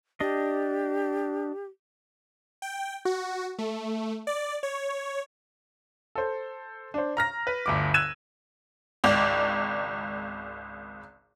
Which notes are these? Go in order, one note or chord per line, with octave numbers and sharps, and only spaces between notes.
D4 G4 D#5
G5
F#4
A3
D5
C#5
A4 C5
D4 C5
A#5 F6 A#6
B4
G1 D2 D6
E6 F#6 G#6 D#7 E7
G#1 C#2 D5